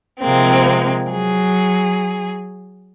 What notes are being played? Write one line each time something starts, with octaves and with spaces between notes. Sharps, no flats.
C3 F3 G#3 A#3 C4
F#3 G#4